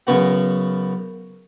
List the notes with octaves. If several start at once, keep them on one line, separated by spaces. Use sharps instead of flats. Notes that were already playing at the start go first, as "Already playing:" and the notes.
F#2 C#3 B3 F#4